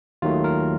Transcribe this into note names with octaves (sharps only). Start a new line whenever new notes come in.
D#2 D#3 F#3 A3 F4
A#4